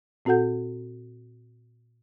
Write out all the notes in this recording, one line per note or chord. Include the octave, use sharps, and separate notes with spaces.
A#2 C4 F#4 A4 F#5 G6